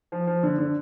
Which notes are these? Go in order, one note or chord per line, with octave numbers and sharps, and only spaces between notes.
F3
F3
D3
D3